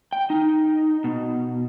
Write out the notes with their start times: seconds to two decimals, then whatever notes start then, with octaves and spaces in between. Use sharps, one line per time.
0.13 G5
0.30 D#4
1.04 B2